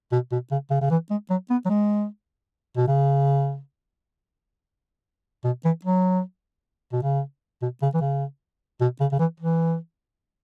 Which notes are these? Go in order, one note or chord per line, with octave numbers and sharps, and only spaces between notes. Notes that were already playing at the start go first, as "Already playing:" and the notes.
B2
B2
C#3
C#3
C#3
E3
G#3
F#3
B3
F#3
G#3
B2
C#3
B2
E3
F#3
B2
C#3
B2
C#3
E3
C#3
B2
C#3
C#3
E3
E3